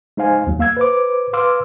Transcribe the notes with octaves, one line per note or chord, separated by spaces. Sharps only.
G#3 D#4 C5 F5 G#5
D#2 F#3
A#3 F5 E6 G#6
B4 C5 D6
B4 F5 C6 D6 E6 F6